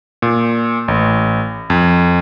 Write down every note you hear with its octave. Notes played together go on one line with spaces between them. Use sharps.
A#2
A1
F2